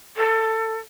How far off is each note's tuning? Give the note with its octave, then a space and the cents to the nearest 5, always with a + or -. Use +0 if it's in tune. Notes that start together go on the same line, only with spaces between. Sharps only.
A4 +25